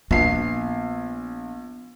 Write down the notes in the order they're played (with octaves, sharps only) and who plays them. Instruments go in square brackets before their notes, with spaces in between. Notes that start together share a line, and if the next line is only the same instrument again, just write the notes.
[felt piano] A#1 C7 [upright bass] B3